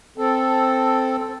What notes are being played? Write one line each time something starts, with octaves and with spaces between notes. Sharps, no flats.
C4 A4